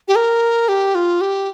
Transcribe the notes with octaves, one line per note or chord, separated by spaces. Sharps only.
G4
A#4
G4
F4
G4